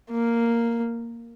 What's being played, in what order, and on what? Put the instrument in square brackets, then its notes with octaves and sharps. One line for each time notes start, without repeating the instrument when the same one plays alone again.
[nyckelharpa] A#3